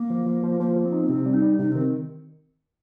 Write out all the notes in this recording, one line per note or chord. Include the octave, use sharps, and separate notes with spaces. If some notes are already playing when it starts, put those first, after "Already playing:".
Already playing: A#3
F3
F3
F3
F3 A#3
F3
C4
D#4
A#3
C3 C4
G3
D#4
G3
C3 D#4
D#3 C4